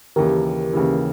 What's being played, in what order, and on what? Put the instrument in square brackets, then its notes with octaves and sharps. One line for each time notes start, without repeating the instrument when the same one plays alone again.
[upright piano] D#2 C#3 E3 [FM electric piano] G4 A#4
[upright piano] D#2 C#3 E3